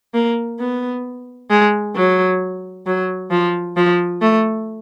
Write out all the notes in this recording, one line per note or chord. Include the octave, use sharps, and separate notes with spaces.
A#3
B3
G#3
F#3
F#3
F3
F3
A3